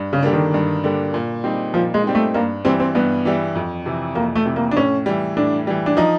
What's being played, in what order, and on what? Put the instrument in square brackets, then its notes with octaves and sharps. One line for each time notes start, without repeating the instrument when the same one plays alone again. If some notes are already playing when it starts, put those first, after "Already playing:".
Already playing: [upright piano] G2
[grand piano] C#3
[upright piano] D3 G3 A#3 D4
[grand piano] D#3
[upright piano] G2
D3 G3 A#3 D4
A#2
G3 C4 D#4
[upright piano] A#2 [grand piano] F3
[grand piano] G#3
[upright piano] G3 C4 D#4
[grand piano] A3
[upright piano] G2 [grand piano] A#3
[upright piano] E3 G3 [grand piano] C4
[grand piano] C4
[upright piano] G2 [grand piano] B3
[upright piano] E3 G3
F2
C3 E3
[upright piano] F2 [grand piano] A#3
[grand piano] A3
[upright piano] C3 E3
[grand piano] A#3
D4
[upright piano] A2 [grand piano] C#4
[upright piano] E3 G3
[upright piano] A2 [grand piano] D4
[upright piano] E3 G3
[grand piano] D4
[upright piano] F3 [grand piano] D#4